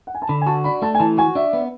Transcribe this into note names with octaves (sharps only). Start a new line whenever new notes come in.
F#5
G#5
A5
D3 B5
G#5
F#4 A5
D4 B5
A3 A5
G#5
E3 A5
F#4 G#5
D4 E5
B3